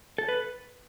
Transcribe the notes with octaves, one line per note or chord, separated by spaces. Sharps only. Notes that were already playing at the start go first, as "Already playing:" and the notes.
A4
B4